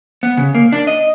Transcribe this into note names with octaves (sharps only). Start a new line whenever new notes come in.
B3
C#3
A#3
D4
D#5